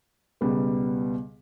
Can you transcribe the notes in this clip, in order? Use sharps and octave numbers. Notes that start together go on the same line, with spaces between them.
C#2 B2 G3 B3